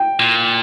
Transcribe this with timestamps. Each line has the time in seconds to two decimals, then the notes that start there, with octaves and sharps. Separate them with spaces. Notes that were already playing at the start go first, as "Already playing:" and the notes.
Already playing: G5
0.20 A#2